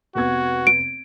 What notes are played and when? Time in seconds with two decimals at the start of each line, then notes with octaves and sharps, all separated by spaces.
0.15 F1 B3 F#4 G#6
0.67 D7